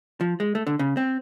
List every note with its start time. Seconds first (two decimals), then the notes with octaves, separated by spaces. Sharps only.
0.21 F3
0.40 G#3
0.55 A3
0.67 D3
0.79 C#3
0.97 C4